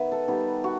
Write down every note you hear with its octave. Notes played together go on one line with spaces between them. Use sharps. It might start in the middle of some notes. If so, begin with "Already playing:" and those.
Already playing: D#3 B3 B4 E5
A4
D#3 G3 B3
F#4